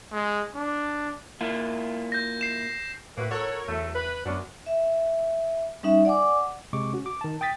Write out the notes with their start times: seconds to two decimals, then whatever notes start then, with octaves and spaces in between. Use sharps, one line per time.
0.12 G#3
0.55 D4
1.41 A#3 E4 F4
2.12 G6 A#6
2.41 C7 E7
3.17 A2 A#3 F#4 B4
3.31 F#4 A4 A#4 C#5
3.68 E2 F#3 A3
3.95 B4
4.26 F#2 F#3 B3 C#4 D4
4.66 E5
5.83 G3 C#4 D#4 E5
6.05 D5 F#5 G#5 D6
6.73 C3 G#3 C#6 D6
6.93 C#4 F#4
7.06 D6
7.21 D#3 A5
7.41 G5 D#6 A6 B6